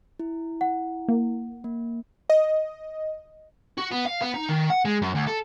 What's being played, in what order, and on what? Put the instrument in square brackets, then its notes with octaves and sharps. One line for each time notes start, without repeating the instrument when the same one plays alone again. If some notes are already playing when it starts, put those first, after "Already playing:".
[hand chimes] E4
[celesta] F#5
[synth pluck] A#3
[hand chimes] A#3
[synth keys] D#5
[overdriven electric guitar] F#4
B3
F5
B3
D#4
D#3
F#5
G#3
F#2
D2
A4